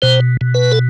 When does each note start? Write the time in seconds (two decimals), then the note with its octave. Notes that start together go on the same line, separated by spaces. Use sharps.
0.02 B2 C5
0.41 B2
0.54 B4
0.72 A4